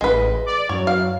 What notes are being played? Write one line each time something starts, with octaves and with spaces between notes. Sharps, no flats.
A1 G#3 B4
D5
F#2 F#3 C#5
F5